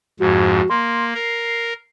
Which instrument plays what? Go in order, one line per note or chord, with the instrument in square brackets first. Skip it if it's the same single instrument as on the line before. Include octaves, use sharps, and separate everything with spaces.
[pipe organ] F2 G#2 [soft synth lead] F#4
[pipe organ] A#3 [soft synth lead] C6
[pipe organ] A#4 [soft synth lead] C7